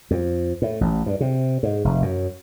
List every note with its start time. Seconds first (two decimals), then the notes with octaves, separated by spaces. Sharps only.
0.11 F2
0.62 A2
0.81 A1
1.06 G2
1.21 C3
1.63 G#2
1.84 F1
2.02 F#2